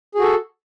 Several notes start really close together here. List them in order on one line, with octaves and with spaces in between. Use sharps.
G#4 F#4 A4